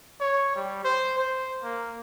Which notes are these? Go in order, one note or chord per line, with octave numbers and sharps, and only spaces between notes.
C#5
G3
C5
C5
A#3